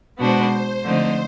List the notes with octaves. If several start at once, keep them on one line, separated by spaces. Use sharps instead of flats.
B2 G#3 B3 D4 F#4 C5
D3 F3 A3 C4 D#4